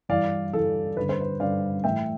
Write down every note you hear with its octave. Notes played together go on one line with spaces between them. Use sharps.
G2 E3 D5 F5
G2 E3 A4
G2 D3 B4
C5
B4
G2 D3 D5 F5
A2 E3 E5 G5